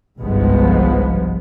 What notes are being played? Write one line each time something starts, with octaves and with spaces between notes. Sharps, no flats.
G1 C2 G#2 F3 G#3 B3